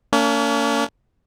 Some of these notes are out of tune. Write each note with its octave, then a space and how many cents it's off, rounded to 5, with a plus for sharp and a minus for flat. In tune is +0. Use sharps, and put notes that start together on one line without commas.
A#3 -35 C#4 +40